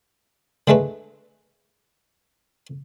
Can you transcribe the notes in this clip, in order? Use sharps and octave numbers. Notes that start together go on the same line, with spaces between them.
D3 G#3 A3 B4